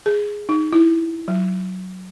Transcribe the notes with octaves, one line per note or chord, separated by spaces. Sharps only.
G#4
D#4
E4
F#3